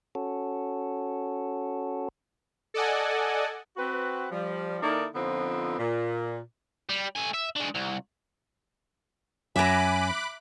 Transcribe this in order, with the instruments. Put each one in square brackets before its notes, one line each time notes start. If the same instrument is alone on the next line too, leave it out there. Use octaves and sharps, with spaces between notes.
[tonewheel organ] C#4 F#4 A4
[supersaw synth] A4 D5 D#5 F#5 G#5
[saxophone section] C4 F#4 B4
F3 G3
D#3 A#3 D#4 E4 A4 D5
F2 D3 F3 B3 C4 D#4
A#2
[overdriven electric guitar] G3
A3 G#5
E5
G#3 D4
C2
[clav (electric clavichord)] F#2 F#3 [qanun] E5 A#5 [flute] G#5 [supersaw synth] B5 D6 F#6